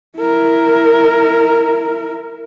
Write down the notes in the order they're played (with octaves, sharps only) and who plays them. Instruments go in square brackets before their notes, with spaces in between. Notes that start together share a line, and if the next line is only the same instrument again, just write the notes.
[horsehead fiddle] E4 A#4